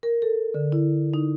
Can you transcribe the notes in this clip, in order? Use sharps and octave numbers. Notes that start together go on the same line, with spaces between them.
A#4
A4
D3
E4
D#4